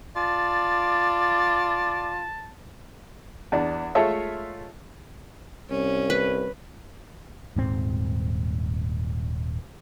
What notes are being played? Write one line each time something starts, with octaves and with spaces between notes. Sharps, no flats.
F4 D5 A5
E2 D4
G#3 A3 F4 A4 C#5 E5
C2 C#4
B4
D#1 G#2 C4